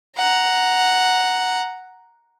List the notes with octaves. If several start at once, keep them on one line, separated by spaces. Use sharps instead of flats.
F#5 A#5